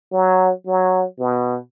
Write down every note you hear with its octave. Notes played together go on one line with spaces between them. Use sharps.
F#3
F#3
B2